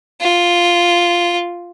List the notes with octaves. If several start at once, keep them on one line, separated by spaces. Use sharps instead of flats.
F4